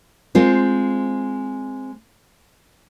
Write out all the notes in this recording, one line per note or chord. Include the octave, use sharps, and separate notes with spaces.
G#3 C4 F4 C5